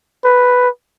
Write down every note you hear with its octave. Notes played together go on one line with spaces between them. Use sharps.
B4